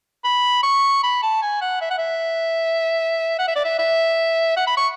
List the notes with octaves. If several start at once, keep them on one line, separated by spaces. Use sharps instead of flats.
B5
C#6
B5
A5
G#5
F#5
E5
F#5
E5
F#5
E5
D5
E5
E5
F#5
B5
C#6